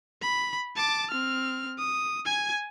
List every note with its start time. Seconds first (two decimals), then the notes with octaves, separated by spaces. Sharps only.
0.22 B5
0.76 A5 D6
1.11 C4 F6
1.79 D#6
2.25 G#5 G#6